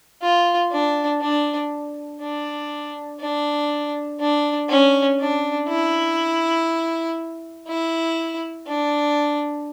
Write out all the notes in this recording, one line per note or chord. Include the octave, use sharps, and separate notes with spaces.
F4
D4
D4
D4
D4
D4
C#4
D4
E4
E4
D4